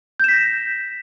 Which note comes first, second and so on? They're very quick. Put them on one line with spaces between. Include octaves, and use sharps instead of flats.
G6 E7 B6 A#6